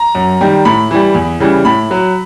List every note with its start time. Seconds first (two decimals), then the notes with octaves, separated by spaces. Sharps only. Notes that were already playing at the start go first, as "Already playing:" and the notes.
Already playing: A#5
0.15 F#2
0.41 D#3 G3
0.65 A2 B5
0.91 E3 G3
1.15 E2
1.40 C#3 E3 G3
1.65 A2 B5
1.91 F#3